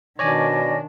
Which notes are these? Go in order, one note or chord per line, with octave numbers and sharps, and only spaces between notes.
B2 D#3 D4 C#5 D5 G#5 A#6